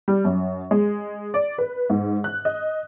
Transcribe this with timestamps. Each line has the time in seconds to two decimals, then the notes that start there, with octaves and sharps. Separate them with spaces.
0.08 G3
0.25 F#2
0.71 G#3
1.34 D5
1.58 B4
1.90 G#2
2.24 F#6
2.45 D#5